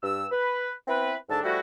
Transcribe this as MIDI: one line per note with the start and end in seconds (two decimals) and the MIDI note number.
0.03 0.26 43
0.03 0.26 88
0.31 0.72 71
0.88 1.15 59
0.88 1.15 60
0.88 1.15 64
0.88 1.15 71
1.29 1.39 39
1.29 1.39 44
1.29 1.39 50
1.29 1.39 62
1.29 1.39 76
1.29 1.39 81
1.44 1.59 53
1.44 1.59 55
1.44 1.59 57
1.44 1.59 64
1.44 1.59 66